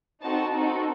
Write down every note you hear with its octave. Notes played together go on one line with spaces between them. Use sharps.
C4 D#4 F#4 A4 A5
C4 D#4 F#4 A4